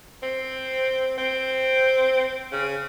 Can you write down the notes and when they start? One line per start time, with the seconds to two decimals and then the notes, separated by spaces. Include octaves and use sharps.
0.23 C4
1.18 C4
2.52 C#3